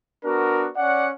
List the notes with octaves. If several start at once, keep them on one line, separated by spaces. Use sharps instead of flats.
B3 D4 F#4 A#4
C#4 D5 F#5